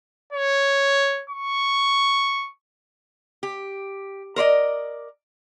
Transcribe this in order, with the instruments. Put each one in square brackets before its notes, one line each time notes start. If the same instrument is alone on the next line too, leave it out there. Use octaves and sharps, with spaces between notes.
[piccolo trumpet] C#5
C#6
[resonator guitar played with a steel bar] G4
A#4 C5 D5 D#5